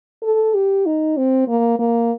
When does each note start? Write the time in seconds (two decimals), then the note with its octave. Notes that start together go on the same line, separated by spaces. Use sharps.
0.23 A4
0.55 G4
0.86 D#4
1.17 C4
1.48 A#3
1.79 A#3